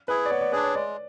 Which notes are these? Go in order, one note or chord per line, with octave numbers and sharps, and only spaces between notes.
E4 G#4 B4
D5
B3 C#5
D5
D4 G#4 B4
C#5
G#3 D5